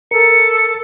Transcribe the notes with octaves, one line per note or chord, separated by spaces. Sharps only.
A4 A#4 C#7